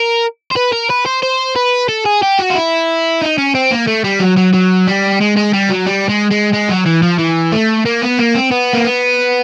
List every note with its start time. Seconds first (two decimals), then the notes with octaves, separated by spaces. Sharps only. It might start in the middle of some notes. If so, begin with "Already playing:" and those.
Already playing: A#4
0.51 C5
0.56 B4
0.72 A#4
0.90 B4
1.06 C5
1.23 C5
1.56 B4
1.89 A4
2.05 G#4
2.22 G4
2.39 F#4
2.50 F4
2.55 E4
3.22 D#4
3.38 C#4
3.55 C4
3.71 A#3
3.87 A3
4.04 G3
4.20 F#3
4.37 F#3
4.54 F#3
4.87 G3
5.20 G#3
5.36 G#3
5.53 G3
5.70 F#3
5.86 G3
6.09 G#3
6.31 G#3
6.53 G#3
6.69 F#3
6.86 E3
7.03 F3
7.19 E3
7.52 A3
7.85 A#3
8.02 B3
8.19 A#3
8.35 C4
8.51 B3
8.73 A#3
8.85 B3